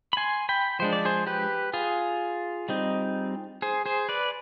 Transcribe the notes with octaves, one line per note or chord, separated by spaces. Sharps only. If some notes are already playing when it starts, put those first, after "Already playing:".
B5
G#5 C6
G5 B5
F3 G#3 D4 C5
D5
G#4 C5
G4 B4
F4 G#4
G3 C4 D#4
G#4 C5
G#4 C5
B4 D5